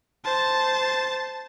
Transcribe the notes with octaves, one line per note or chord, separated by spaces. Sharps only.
C5 A5